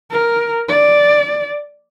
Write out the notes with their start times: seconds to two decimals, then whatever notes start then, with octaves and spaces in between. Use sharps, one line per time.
0.12 A#4
0.69 D5